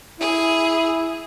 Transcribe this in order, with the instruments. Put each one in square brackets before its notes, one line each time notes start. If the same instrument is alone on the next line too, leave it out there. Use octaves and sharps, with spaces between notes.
[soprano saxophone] E4 [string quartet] G#4